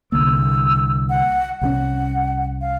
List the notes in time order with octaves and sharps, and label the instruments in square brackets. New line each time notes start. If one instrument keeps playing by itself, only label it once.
[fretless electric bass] C2 D3 A#3 [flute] E6
[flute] F#5
[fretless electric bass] C2 F#3 C#4 [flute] F#5
[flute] F5